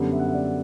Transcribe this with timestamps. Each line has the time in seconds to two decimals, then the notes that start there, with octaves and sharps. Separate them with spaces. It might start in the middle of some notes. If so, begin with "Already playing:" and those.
Already playing: F#2 D3 G3 B3
0.12 E5
0.19 F#5
0.27 E5
0.34 D5